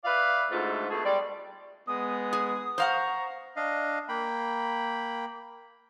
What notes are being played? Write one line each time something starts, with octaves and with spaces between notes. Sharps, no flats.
B4 D5 E5 F5
D2 G#2 A3 F4
B2 A3 G#4 A4
G3 G#3 D5
G#3 B3 D#6
G#4
C5 F5 F#5 A#5 C#6
D4 D#5 F5
A#3 G5 B5